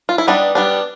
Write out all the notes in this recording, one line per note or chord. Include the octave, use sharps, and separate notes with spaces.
F4
E4
G3 B3 D4 D#4
G3 B3 D4